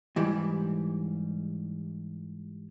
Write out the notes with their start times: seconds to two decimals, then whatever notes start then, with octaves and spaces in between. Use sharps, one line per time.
0.16 G#2 E3 G3